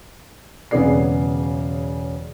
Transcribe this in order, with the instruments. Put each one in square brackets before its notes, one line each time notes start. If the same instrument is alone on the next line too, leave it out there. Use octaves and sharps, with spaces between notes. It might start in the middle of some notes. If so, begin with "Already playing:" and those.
[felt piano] E1 C#3 B3 G#4 D5 C7